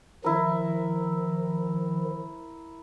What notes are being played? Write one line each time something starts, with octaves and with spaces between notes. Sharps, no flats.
D#3 F3 E4 A#4